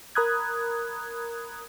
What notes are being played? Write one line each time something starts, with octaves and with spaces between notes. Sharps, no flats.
A#4 A#5 B5 D#6 F#6 G#6